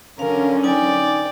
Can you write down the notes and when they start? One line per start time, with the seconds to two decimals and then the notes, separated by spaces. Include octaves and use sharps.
0.19 D3 F#3 C#4 A#4 F5
0.63 D#4 D5 G5 G#5